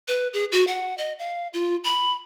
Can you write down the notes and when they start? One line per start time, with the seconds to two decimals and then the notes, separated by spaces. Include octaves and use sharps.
0.08 B4
0.33 G#4
0.52 F#4
0.67 F#5
0.98 D#5
1.19 F5
1.53 F4
1.84 B5